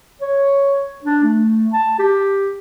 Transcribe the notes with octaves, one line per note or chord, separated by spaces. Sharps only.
C#5
D4
A3
A5
G4